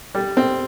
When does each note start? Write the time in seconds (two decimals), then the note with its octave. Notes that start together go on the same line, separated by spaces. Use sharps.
0.15 G3
0.37 C4